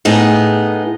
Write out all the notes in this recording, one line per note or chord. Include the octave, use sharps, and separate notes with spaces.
A2 B3 D#4 G#4